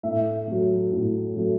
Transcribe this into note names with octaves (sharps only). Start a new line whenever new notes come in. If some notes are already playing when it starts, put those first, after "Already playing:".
A2 E5
F#3 A3
A2
F#3 A3